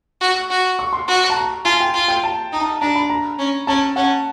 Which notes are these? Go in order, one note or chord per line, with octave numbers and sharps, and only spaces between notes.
F#4
F#4
C#6
C6
F#4
A5
A#5
F4 G#5
G5
F4
G5
A5
D#4
D4 A#5
B5
A#5
C#4
C#4 A5
C#4 F#5